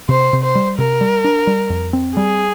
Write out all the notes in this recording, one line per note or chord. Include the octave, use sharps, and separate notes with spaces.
C3 C5
C3
C5
G3
C3 A#4
G3
D4
G3
F2
C4
G3 G#4